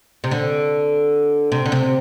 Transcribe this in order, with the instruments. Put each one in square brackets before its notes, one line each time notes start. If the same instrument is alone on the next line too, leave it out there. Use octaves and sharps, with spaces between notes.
[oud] C3
D3
C3
D3
C3